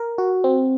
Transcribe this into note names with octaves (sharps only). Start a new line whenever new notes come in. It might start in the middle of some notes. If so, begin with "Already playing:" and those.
Already playing: A#4
F#4
C4